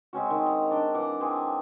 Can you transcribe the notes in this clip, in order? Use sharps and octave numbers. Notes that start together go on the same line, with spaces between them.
G#3 C4 C#4 F#4
D#3
A#5
D4 G5
E3 F#5 D6
E3 C4 G#4